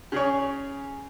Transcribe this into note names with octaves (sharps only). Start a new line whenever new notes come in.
C#3 G#4 C#5